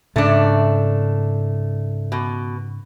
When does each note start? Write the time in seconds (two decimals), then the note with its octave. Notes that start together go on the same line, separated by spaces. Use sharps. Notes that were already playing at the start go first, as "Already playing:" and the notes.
0.16 G#2 C#3 A3 D4
2.12 B2